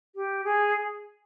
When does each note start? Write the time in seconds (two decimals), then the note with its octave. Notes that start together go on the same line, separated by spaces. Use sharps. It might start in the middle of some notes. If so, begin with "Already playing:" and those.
0.15 G4
0.44 G#4